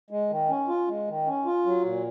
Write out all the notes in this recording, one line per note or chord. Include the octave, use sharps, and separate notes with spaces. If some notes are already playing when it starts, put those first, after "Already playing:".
G#3
D#3
C#4
F4
G#3
D#3
C#4
F4
F#3
A#2